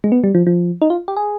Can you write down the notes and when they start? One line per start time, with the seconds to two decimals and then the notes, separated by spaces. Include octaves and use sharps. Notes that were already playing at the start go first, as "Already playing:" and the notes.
0.04 G#3
0.12 B3
0.24 G3
0.35 F3
0.47 F3
0.82 D#4
0.90 F4
1.08 G4
1.17 G#4